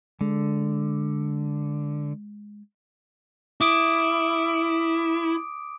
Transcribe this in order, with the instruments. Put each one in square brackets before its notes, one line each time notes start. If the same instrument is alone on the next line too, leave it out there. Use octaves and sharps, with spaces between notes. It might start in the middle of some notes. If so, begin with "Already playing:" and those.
[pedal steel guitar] D3 [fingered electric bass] G#3
[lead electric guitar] E4 [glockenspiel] D6 D#6 D7